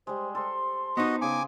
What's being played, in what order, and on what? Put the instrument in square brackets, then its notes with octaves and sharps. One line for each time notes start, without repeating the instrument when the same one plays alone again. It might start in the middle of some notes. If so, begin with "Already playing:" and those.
[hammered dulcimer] G3 G#3 [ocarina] C5
[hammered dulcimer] A4 C5 [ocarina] C6
[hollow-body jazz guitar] B3 D#4 [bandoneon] F#4 D#5 [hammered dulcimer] C5
[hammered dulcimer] C#3 G#4 G5 [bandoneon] G#5 D6